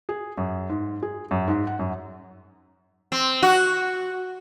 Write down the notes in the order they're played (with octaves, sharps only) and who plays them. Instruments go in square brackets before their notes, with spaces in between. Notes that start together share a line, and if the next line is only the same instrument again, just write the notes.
[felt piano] G#4
F#2
G#2
G#4
F#2
G#2
F#5
F#2
[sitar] C4
F#4